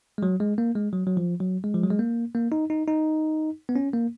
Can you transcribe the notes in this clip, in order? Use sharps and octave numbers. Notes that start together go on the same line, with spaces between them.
G#3
F#3
G#3
A#3
G#3
F#3
F#3
F3
F#3
G#3
F3
F#3
G#3
A#3
A#3
D#4
D#4
D#4
B3
C#4
A#3